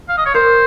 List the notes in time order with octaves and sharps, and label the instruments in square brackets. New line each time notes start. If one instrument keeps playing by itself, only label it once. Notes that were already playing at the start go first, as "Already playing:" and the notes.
[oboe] F5
D#5
C#5
[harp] A#4 [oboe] C5